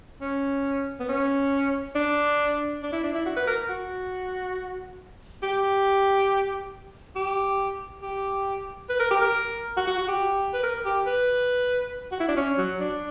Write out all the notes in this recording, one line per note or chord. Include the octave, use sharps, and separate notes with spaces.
C#4
B3
C#4
D4
D4
E4
D4
E4
F#4
B4
A#4
F#4
G4
G4
G4
B4
A#4
G4
A#4
F#4
F#4
F#4
G4
B4
A#4
G4
B4
F#4
E4
D4
C#4
F#3
D4